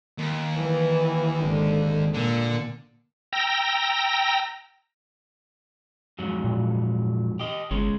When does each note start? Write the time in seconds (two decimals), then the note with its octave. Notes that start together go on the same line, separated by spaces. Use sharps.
0.18 D#2
0.58 E3
1.42 G#1 D3
2.14 A#2 D3
3.33 G5 A#5 E6 A#6
6.19 F2 G#2 F#3
6.44 A#2
7.40 G4 D#5
7.71 G1 G#3 C#4